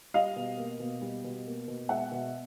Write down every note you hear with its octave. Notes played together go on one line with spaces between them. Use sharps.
G3 D#5 F5
B2
A#3
B2
G3
B2
A#3
B2
G#3 E5 F#5
B2